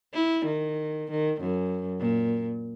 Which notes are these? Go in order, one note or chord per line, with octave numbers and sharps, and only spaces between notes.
E4
D#3
D#3
F#2
A#2